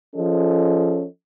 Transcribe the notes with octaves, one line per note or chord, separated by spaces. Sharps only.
F3 C#4 G#4 A4 D#5